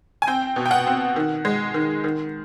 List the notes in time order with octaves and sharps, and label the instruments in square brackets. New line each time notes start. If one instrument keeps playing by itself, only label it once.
[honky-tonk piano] G#5
C4 G5
B2
G5
F#5
C4
D#3
G#3
D#3
D#3